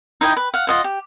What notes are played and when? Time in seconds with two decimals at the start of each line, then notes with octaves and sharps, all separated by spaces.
0.21 D#4 E4 D#5 G5
0.36 B4
0.54 F5 F#5
0.67 F4 D#5 F#5
0.84 G4